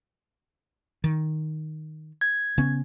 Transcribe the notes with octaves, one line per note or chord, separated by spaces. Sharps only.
D#3
G#6
C#3 B3 C#4